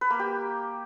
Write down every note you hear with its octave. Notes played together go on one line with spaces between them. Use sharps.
B4
A#3
G4